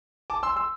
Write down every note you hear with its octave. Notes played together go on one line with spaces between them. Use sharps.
A5 D6
C6 E6
C6 E6